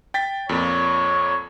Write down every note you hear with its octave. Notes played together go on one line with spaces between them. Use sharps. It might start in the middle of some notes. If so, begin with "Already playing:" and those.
G5 A6 B6
F2 A#2 C#5